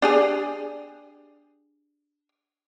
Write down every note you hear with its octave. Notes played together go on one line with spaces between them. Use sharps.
D4 G4 G#4